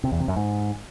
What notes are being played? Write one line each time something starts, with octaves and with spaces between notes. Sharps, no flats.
C3
E2
C3
F#2
G#2